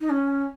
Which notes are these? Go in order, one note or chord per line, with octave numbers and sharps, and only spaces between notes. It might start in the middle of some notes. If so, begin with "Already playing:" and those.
D#4
C#4